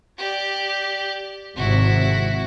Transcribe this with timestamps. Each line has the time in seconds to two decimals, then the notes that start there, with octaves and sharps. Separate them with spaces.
0.18 G4 D5
1.56 G#1 C3 E4 F#4